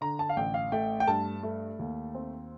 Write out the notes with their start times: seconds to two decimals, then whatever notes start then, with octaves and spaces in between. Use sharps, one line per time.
0.01 D3 A#5
0.19 A5
0.29 F5
0.37 A1 G5
0.54 F5
0.72 A3 G5
1.00 G5
1.08 G2 A5
1.43 A3
1.79 D#2
2.15 C4